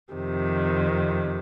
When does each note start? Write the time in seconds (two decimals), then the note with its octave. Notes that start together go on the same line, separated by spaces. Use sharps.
0.13 F2 C3 D#3